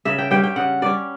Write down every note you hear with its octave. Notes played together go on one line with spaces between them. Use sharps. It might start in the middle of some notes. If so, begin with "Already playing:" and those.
C#3 E5
G5
G3 C#4 G5
G5
C#3 F#5
G3 C#4 D5